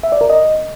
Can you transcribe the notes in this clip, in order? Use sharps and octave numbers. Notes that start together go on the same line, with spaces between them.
E5
D5
A#4
D#5